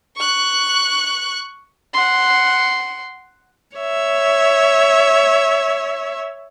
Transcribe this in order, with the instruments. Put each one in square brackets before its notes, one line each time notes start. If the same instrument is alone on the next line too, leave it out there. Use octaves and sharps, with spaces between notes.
[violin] C#6 F#6
[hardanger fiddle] F#5 C6
[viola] C#5 E5